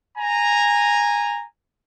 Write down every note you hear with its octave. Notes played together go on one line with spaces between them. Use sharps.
G#5 A#5